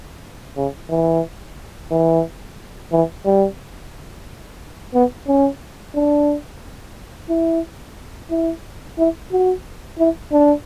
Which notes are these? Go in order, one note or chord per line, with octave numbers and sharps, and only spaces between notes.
C#3
E3
E3
E3
G3
B3
C#4
D4
E4
E4
E4
F#4
E4
D4